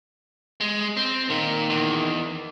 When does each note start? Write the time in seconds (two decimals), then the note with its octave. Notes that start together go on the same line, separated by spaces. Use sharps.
0.60 G#3
0.97 C4
1.30 A#2 D#3
1.70 E2